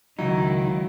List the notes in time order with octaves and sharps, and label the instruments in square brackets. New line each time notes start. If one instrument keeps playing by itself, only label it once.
[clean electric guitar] C#2 D#4 [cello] D#3 [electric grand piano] F#3 E4